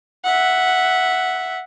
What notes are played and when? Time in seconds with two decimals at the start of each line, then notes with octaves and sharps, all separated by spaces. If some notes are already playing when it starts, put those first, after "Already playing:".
0.25 E5 F#5